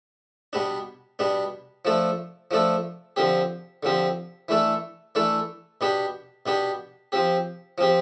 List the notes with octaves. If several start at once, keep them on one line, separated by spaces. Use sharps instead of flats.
B2 G3 B3 D4
B2 G3 B3 D4
F3 A3 D4 A4
F3 A3 D4 A4
D3 F3 C4 G4
D3 F3 C4 G4
E3 A3 D4 A4
E3 A3 D4 A4
B2 B3 D4 G4
B2 B3 D4 G4
F3 C4 G4
F3 C4 G4